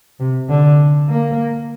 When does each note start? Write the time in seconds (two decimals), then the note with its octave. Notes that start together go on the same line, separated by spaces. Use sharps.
0.20 C3
0.49 D3
1.09 A#3